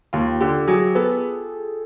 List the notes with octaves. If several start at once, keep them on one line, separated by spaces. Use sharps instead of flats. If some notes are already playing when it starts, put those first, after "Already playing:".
D#2 F4
D3 G4
F#3 G#4
B3 A4